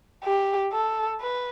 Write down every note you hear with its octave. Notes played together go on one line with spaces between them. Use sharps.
G4
A4
B4